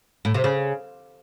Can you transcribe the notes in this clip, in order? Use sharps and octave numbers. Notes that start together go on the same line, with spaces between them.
A2
C3
C#3